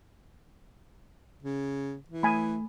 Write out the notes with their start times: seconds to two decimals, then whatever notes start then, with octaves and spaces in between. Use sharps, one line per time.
1.43 C#3
2.08 E3
2.23 A3 G#5 B5